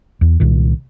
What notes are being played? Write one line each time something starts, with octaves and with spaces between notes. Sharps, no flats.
E2
C2 A#2 D#3